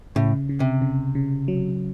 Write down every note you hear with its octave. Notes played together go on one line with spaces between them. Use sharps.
A2 C#3
C#3
C3
C#3
C#3
F#3